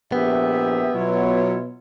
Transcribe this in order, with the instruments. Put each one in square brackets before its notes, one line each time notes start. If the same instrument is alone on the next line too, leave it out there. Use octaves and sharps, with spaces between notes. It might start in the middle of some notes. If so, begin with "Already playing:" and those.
[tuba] A#1 [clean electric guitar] B3 [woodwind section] G4 G#4 E5
[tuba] B2 [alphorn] F#3 [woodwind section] E4 F4 C#5